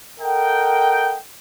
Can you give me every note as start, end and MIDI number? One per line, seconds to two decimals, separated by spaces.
0.21 1.18 69
0.21 1.18 70
0.21 1.18 75
0.21 1.18 78
0.21 1.18 79